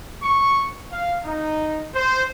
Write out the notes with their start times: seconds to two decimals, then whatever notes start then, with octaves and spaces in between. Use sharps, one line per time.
0.23 C#6
0.92 F5
1.25 D#4
1.95 C5